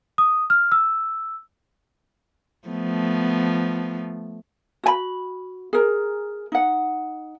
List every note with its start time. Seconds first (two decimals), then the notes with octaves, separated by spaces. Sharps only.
0.18 D#6
0.50 F6
0.72 E6
2.68 F3 A3 B3
4.84 F#4 G#5 B5
5.73 G#4 A#4
6.52 D#4 F#5